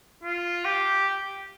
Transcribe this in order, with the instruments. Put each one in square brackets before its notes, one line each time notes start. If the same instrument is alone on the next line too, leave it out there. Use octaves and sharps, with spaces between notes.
[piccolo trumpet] F4
G4